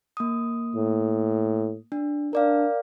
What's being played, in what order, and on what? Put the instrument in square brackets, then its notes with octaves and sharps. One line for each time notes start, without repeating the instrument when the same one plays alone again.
[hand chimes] A#3 D#6
[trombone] A2
[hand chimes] D4
[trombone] D4 [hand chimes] A#4 D5 F5